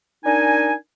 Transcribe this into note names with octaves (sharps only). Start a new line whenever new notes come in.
D4 D#4 A#4 G#5